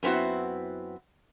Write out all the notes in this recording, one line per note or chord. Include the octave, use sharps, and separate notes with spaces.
F#2 B3 C4 E4 F#4